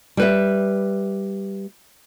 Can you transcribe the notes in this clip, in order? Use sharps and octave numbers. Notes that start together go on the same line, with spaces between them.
G3 B4 E5